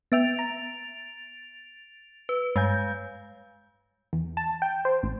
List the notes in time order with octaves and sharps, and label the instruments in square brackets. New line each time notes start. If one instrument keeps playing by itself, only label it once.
[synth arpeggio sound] B3 E5 G5 [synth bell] A6 D7 F7
[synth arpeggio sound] A#5
[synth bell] B4
[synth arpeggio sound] G2 G#5 [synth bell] G#3 F5 G6
[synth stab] E2
A5
G5
C5
A1